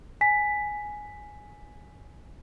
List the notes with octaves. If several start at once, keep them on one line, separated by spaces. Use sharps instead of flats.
G#5 B6